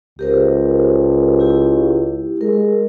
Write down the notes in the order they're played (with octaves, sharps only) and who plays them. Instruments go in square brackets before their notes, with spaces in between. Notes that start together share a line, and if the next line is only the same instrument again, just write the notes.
[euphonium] C#2 [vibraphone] G4 A#4 C5
[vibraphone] E4 G4
[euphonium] G#3 [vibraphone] A#4